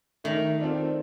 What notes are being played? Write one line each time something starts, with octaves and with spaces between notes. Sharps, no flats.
D#3 A3
C4 F4 A4 D5